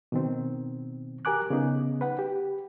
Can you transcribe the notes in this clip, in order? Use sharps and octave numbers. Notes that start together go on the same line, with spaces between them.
B2 D#3 C4
G4 A#4 G#5 D6 F#6
C#3 B3 D#4
B4 F#5
G4